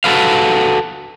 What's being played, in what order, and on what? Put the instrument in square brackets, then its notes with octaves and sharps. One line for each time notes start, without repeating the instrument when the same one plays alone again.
[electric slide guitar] F#4 A4 B4 F5